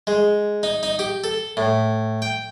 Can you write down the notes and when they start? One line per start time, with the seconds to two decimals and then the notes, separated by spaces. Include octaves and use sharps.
0.07 G#3
0.63 D#4
0.83 D#4
0.99 G4
1.24 A4
1.57 A2
2.22 G5